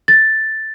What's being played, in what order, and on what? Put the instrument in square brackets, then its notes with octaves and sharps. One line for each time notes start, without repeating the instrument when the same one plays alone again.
[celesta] A6